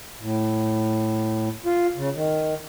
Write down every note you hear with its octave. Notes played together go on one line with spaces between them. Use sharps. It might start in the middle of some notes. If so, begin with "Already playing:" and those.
A2
F4
C#3
D#3